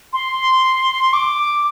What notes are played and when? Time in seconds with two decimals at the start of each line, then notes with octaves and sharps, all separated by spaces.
0.13 C6
1.13 D6